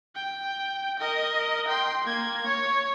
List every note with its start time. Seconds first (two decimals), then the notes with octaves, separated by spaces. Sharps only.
0.15 G5
1.00 A#4 D#5
1.68 G5 C6
2.05 A#3 G#6
2.47 C#5